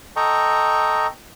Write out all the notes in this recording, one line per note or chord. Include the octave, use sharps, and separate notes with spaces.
A4 D#5 G5 A#5 C#6